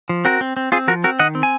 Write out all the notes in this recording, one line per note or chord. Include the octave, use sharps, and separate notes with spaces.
F3
C4 F#4 A#4
C4
C4
C4 F4 G#4
F3 F#4 A#4
C4 F#4 A#4
D#3 D#5 F#5
C4
G#5